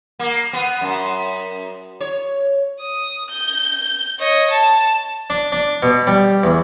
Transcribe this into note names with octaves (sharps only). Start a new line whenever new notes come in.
A#3
B3
F#2
C#5
D#6
G6
C#5 D#5
A5
D4
D4
B2
G3
E2